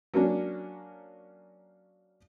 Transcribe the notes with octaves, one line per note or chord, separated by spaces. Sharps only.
F#3 A#3 C#4 D4